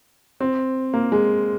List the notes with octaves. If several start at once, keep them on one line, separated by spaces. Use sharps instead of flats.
C4
A#3
G#3